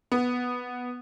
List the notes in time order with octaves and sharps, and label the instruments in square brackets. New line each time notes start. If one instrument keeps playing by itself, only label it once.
[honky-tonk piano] B3